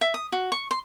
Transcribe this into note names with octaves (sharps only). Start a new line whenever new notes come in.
E5
D#6
F#4
C#6
C6